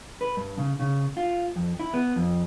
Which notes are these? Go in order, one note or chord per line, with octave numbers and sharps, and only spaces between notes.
B4
G2
C#3
C#3
F4
F2
E4
B3
F2